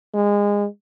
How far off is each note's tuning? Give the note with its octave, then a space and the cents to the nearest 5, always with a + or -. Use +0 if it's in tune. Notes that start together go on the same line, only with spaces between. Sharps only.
G#3 -25